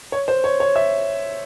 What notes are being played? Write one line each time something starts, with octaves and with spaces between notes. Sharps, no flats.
C#5
C5
C#5
C#5
E5